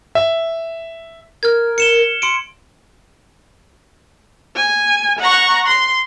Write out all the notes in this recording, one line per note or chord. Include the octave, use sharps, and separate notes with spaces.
E5
A#4 F6 G#6
C#7 E7 G7
C6 C#7 D7
G#5
F#5 A#5 C#6
C6